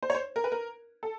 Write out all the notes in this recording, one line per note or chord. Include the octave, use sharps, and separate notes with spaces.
C5
C#5
C5
A#4
B4
A#4
A4